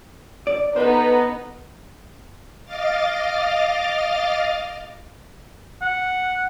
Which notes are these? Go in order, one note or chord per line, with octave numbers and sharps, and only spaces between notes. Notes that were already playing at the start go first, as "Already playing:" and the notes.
D5
B3 D#4 A4 B4 C5
D#5 F5 D6 F6 A6
F#5